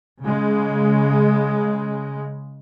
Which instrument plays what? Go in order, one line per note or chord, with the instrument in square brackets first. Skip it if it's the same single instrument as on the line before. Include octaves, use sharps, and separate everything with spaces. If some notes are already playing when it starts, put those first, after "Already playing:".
[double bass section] C#3 G#3